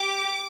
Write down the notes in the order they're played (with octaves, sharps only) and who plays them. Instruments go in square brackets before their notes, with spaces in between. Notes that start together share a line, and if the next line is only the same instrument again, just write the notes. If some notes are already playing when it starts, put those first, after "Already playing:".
Already playing: [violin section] G4 D6